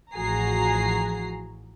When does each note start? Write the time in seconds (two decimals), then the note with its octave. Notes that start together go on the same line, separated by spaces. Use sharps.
0.14 A1 F3 F#4 G#4 A#5 C7